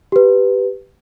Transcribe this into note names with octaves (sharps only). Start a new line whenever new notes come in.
G4 B4